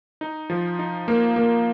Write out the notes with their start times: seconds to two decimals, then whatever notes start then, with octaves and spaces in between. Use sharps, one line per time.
0.21 D#4
0.50 F3
0.79 D#4
1.08 A#3
1.36 A#3